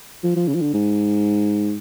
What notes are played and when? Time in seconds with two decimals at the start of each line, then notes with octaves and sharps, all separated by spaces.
0.23 F3
0.36 F3
0.48 C#3
0.55 F3
0.61 D3
0.74 G#2